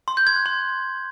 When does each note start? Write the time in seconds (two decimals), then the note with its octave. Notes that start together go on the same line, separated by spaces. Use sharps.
0.08 C6
0.17 G6
0.27 G#6
0.36 F#6
0.46 C6